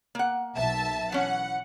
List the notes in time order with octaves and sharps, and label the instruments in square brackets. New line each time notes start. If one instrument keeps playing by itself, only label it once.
[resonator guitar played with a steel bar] A#3 F#5
[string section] B1 E5 A5
[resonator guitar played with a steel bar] E3 C#4 [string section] F#5